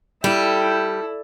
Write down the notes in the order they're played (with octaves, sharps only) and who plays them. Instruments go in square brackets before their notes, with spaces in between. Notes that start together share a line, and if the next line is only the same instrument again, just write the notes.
[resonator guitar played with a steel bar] G3 [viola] E4 [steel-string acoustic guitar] A4 [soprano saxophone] G5